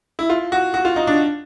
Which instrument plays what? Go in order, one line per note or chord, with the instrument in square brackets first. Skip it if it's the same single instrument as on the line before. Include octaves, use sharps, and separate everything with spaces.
[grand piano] E4
F4
F#4
F#4
F4
D#4
D4